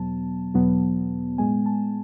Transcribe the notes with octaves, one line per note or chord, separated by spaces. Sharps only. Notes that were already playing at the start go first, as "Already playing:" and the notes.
Already playing: E2 B2 F#3 B3 A5
E2 B2 F#3 B3
A2 G#3 B3 G#5
A5